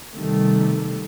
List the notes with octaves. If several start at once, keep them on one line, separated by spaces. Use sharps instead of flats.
C3 D#3 G3 A3